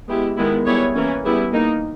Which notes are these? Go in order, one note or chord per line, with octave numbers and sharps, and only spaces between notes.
G#3 B3 E4 G4
D#3 G#3 B3 E4
G3 B3 E4 G#4 C#5
E3 A#3 C#4
G3 B3 E4 G#4
D#3 A#3 D#4